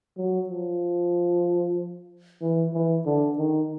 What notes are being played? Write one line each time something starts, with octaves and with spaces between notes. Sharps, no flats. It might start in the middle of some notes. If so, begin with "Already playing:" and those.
F#3
F3
E3
E3
D3
D#3